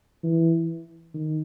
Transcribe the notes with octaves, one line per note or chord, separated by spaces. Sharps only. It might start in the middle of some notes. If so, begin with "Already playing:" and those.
E3
D#3